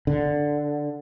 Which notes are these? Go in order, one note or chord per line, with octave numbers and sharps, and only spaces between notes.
D3